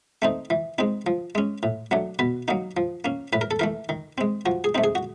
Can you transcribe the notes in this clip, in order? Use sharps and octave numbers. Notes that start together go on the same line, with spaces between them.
A3 C4 D#4
E3
G#3 C4 D#4
F3
G#3 C#4
A2
F#3 A3 D4
B2 B4
F#3 A#3 D#4
F3
A#3 C#4
A2 B4
A#4
A4
E3 A3 A#4
D#3
G#3 C4
F3 F#4
G#4
A3 C4 D#4
G#4
F#4